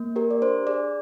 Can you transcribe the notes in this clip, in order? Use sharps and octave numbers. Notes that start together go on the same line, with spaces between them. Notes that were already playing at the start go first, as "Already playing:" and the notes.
Already playing: A#3
G4 A#4
D5
D4 C5
G#4 D5